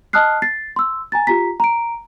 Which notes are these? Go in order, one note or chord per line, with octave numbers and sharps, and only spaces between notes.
D#5 A5 D#6 F6 F#6 C7
A6 C7
C6 E6
G#5 A#5 A6
F4 G4 A#5 B6
A#5 D7